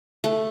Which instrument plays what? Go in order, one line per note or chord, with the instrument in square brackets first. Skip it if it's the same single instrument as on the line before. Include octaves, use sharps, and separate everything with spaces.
[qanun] A3